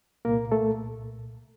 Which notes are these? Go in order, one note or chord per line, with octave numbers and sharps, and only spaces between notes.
C2 A#2 A#3 A#4
A3 A4